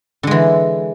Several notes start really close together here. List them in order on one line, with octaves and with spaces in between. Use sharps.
D3 G#3 E3